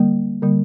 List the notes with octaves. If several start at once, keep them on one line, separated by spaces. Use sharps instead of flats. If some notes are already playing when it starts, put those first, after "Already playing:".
Already playing: D3 G3 A#3
D3 G3 A#3